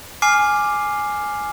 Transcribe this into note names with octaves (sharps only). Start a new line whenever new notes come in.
G#5 D6 F6 C7